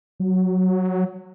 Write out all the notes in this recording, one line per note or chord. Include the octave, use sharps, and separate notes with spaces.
F#3